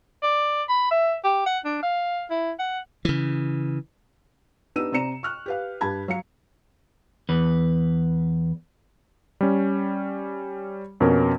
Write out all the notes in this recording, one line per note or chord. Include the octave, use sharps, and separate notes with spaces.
D5
B5
E5
G4
F#5
D4
F5
E4
F#5
C#3 E3
B3 D4 D#4 G4 E6 D#7
C3 C4 D5 A#5 C#7 E7
C#6 F6 F#6
G4 B4 F5
G2 G4 A5 B5 G#6
F#3 F5 C#7
E2 B4
G3 C#4
F2 B2 C#4 A#4